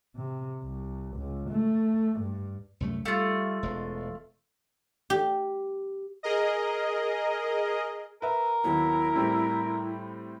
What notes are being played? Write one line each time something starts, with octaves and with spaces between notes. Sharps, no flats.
C3
C2
C#2
A3
G2
C2 F#2 A3
G3 A3 F4
E1 G#3
G4
G#4 A#4 D#5
A#4 B4 E5
D#2 F#3 B3 E4
A2 G3 C4